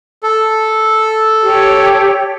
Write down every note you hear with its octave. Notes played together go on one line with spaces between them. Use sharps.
A4
G4 C#5